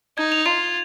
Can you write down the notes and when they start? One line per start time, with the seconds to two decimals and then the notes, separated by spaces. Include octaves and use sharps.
0.18 D#4 G#6
0.32 F7
0.46 F4 F7